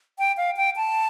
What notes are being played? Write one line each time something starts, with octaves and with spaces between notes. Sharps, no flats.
G5
F5
G5
A5